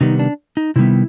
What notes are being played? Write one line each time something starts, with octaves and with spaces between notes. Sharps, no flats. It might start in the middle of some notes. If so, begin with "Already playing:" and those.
C3 D#3 G3 B3 D#4
D4
D#4
C3 D#3 G3 B3 E4